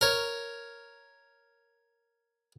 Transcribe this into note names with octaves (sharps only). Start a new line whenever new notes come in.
A#4 C#5